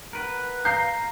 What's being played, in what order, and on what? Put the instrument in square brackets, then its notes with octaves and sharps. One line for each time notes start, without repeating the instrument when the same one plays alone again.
[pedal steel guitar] A#4 B4 F#5
[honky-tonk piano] F5 G6 C7 [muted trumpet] A#5